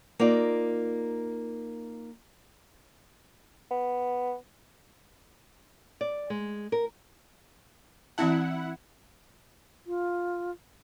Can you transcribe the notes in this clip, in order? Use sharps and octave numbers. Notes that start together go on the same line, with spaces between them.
A#3 D#4 F4 D5
B3
D5
G#3
A#4
E3 C4 E4 F#5 A5
F4